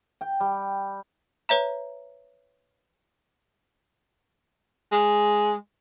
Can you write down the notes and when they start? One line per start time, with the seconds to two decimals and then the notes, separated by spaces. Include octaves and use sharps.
0.21 G5
0.40 G3
1.49 B4 C#5 E5 A#5
4.92 G#3